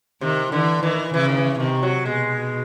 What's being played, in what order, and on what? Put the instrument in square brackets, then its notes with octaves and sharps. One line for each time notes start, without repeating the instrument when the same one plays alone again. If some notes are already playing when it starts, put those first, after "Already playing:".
[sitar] C3 [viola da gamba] D#3
[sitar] D3 [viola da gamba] E3
[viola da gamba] D#3 [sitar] E3
[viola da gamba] C#3 [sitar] E3
[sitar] D#3
E3
[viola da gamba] C3 [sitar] D#3
[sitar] F#3
[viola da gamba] B2 [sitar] G#3